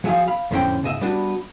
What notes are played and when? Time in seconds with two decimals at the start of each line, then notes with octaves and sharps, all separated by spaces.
0.04 F3 F#3 G#4 E5 F5
0.28 F5 B5
0.51 F2 A2 D3 C#4 C5 G5
0.83 C#2 G#2 D#5 E5
1.01 G3 B3 D4 F#4